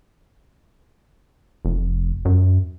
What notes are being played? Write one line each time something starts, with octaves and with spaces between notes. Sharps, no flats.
F1
F#2